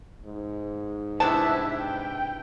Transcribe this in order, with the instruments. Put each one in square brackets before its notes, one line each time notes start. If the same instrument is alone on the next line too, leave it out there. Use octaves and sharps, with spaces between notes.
[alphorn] G#2
[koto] C3 B3 D4 [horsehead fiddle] E4 E5 [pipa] A5
[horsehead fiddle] G5